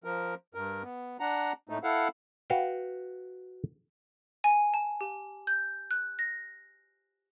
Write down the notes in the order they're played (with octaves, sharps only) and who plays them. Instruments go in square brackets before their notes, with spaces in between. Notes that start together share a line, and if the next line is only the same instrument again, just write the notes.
[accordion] F3 A#4
G2 A#4
B3
D4 F#5 A#5
A2 A3 D#4
E4 A4 F5 F#5
[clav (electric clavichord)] F#4 B4 F5 G5
[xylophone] G#5
A5
G4
G6
F#6
A#6